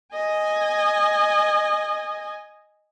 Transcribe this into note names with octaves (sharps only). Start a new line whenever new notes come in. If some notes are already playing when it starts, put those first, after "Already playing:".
D#5 G#5